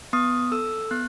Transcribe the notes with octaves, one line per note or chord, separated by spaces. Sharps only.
B3 D#6
A4 E6
B3 F#6